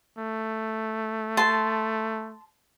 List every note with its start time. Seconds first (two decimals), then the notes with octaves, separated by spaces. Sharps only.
0.18 A3
1.37 A5 C6